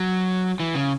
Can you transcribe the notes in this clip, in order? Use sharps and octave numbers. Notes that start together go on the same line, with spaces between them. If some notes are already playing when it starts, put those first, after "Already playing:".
Already playing: F#3
E3
C#3